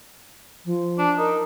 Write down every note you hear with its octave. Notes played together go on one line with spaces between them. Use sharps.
F3
D4
D#4 A#4